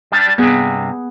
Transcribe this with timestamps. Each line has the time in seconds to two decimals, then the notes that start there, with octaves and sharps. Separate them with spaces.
0.12 G3 D4
0.38 G2 C3 B3 G#4